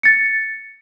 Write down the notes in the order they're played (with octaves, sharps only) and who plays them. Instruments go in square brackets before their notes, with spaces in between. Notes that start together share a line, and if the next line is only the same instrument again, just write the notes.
[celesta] A6 C#7